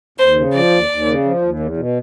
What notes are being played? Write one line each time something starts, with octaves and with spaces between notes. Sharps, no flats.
D#2 C5
C#3
F3 D5
D#2
D#2
C#3
F3
D#2
E2
B2